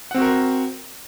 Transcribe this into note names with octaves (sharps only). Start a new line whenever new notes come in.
C4 F#4 A#4 F#5